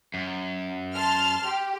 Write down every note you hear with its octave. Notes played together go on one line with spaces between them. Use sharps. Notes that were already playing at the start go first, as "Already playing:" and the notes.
F#2
A5 C6 F6
G4